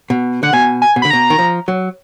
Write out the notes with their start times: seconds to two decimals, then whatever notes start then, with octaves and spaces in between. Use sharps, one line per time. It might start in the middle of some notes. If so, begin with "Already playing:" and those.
0.10 B2
0.43 D3 F#5
0.53 B2 G#5
0.82 G#5
0.96 B2
1.02 D3 B5
1.10 B2 A#5
1.30 D#3
1.38 F3
1.68 F#3